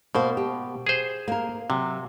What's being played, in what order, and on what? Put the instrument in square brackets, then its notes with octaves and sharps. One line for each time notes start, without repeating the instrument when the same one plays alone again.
[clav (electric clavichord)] B2 [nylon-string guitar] A#3 C5
[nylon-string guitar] G4
[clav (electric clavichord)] G#4 C5
[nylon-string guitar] A#3 A#4
[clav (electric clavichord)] C3 [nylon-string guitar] F#3